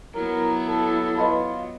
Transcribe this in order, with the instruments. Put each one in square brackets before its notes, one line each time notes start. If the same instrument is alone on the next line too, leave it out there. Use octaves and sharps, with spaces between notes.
[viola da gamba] F#3 B3 [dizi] E4 [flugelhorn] A#4
[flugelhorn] A4
[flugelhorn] F4 [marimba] B4 D#5 B5